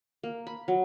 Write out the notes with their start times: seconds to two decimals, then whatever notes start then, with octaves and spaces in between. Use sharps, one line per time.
0.23 A#3
0.47 B5
0.68 F#3